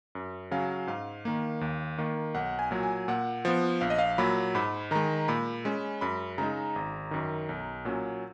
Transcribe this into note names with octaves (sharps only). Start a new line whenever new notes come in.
F#2
C#3 F#3 C#4 F5
G#2 F5
D#3 A#3
D#2
D#3 A#3
B1 F#5
G#5
A#2 F#3
G#5
A#2 F#5
F3 B3
A#1 F5
D#5
F5
A#2 F#3 B5
G#2 B5
D#3 G#3 A#5
A#2 B5
G#3 C#4
F#2 B5
C#3 G#3 D#4 A#5
G#1
F#2 D#3
B1
A#2 F#3 C#4